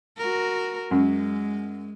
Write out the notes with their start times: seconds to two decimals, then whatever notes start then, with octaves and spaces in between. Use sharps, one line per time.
0.18 F#4 A#4
0.91 F#2 G#3